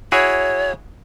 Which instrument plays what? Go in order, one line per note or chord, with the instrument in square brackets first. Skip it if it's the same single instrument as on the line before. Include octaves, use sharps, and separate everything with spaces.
[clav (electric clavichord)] E4 F#4 G#4 [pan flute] C#5